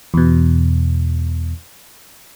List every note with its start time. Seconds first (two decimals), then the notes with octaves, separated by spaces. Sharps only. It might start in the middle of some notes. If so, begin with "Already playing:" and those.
0.14 E2 B2